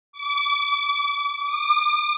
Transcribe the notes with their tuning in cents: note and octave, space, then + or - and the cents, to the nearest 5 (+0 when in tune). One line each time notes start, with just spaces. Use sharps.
D6 -35
D6 +40